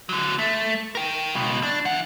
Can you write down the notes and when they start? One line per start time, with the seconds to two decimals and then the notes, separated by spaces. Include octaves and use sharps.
0.09 D3 F#3
0.38 A3
0.95 A#4 G5
1.34 C#2 B2
1.63 D4
1.85 E3 F#5